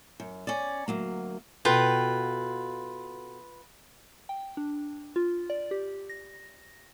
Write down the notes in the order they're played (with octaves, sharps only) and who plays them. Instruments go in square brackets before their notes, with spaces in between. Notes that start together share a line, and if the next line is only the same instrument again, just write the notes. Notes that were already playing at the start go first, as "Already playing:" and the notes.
[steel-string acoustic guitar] F#2
C#4 D5
D2 F#3 A#3
[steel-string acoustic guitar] B2 F#4 A4 [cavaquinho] F4 B4 G5
[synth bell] G5
D4
F4
D5
G4
A#6